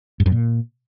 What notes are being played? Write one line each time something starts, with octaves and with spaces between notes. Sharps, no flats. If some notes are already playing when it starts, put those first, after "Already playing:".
G2
F#2
A#2